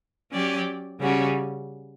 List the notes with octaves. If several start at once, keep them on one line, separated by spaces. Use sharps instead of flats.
F#3 C#4 G4 D5
C#3 G3 C#4 F#4